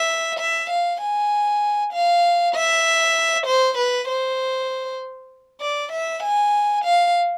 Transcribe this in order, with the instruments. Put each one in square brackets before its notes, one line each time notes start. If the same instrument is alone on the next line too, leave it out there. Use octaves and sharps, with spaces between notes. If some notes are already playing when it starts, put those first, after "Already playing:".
Already playing: [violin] E5
E5
F5
G#5
F5
E5
C5
B4
C5
D5
E5
G#5
F5